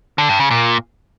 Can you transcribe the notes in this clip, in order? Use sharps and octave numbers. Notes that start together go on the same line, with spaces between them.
D3
G2
C#3
A#2